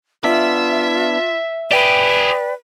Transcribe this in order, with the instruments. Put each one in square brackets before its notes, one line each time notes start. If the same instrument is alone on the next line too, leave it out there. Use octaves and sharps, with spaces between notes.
[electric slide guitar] B3 D4 [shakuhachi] F4 [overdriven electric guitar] E5
[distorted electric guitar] G4 G#4 [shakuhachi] B4 [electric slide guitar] D5 G5